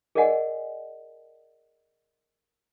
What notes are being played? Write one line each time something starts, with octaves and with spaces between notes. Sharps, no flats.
G#4 A#4 D5 D#5 F#5 G#5